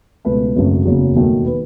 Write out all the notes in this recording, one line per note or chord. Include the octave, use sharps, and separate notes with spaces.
C#2 B2 A3 B4
G#1 F#2 C#3 F#3 A3
F#1 E2 C#3 F#3
E1 D#2 D#3 F#3 A3
D#3 B4